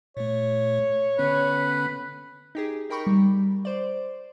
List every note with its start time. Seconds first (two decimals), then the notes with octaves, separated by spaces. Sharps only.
0.17 A#2 A3 C#5
1.19 D3 B3 C#4 B4
2.55 D#4 G4 G#4
2.90 D#4 A#4 G5 B5 C#6
3.07 G3
3.65 C5 D5